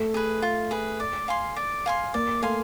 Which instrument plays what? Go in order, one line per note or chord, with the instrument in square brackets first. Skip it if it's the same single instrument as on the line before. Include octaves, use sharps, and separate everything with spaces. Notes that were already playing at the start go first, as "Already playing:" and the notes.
Already playing: [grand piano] A3
[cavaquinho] G#4 B4
F4
G#4 B4
D5
F5 G#5 C6
D5
F5 G#5 C6
[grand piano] A#3 [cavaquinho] D5
[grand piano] A3 [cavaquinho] F5 G#5 C6